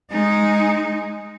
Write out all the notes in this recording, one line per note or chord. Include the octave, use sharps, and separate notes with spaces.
G#3 D#4